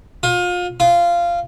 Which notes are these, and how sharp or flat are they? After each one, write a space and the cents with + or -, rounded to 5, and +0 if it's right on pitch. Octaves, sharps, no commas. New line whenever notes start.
F4 +30
F4 -15